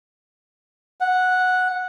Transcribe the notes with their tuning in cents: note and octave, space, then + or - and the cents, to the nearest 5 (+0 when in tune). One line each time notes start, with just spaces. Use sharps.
F#5 -10